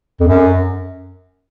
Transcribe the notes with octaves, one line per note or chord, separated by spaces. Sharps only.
F2
F#2